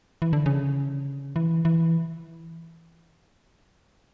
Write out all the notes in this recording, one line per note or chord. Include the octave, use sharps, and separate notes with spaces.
E3
D3
C#3
E3
E3